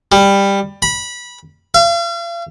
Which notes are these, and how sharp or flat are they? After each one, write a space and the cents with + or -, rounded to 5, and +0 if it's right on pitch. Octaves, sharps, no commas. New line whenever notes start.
G3 +15
B5 -20
F5 -40